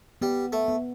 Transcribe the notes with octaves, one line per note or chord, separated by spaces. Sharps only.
G3 B3
A3
B3